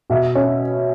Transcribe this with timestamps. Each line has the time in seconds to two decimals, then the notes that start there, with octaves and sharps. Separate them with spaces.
0.10 B2 E5
0.35 C#4